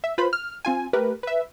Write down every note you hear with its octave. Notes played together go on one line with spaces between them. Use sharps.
E5
F4 B4 C5 B5
F6
C4 F4 G#5
A3 G4 A#4 B4
B4 E5